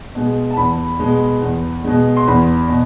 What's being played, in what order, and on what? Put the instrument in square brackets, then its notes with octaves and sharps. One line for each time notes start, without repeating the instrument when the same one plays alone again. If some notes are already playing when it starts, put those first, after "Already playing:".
[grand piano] B2 G#3
A5
E2 B5
B2 G#3
E2
B2 G#3
C6
E2 B5
B2